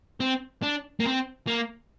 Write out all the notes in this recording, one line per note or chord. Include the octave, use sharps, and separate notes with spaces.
C4
D4
A#3
C4
A#3